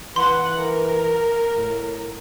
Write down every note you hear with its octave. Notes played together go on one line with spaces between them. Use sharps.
E3 B4 F#5 C6
A#4
A2